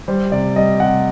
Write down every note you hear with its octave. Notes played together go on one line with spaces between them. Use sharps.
G3 C5
C3 D5
G3 D#5
C3 F#5